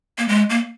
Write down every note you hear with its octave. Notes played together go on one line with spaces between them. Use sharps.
A#3
G#3
A#3